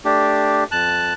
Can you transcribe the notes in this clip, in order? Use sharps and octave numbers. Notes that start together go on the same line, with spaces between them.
A3 D4 G4
F2 A5 F#6